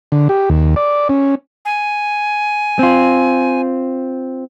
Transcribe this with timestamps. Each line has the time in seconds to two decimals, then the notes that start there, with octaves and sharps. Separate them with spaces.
0.12 D3
0.29 G4
0.49 D#2
0.76 D5
1.09 C#4
1.65 G#5
2.79 C4 F4